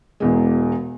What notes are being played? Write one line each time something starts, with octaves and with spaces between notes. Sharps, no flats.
E1 E2 G#3